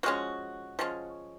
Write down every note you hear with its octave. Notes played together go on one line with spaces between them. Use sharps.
F3 G#3 C#4 F#4
F3 G#3 C#4